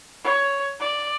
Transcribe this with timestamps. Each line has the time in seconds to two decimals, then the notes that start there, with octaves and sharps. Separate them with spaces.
0.25 C#5
0.80 D5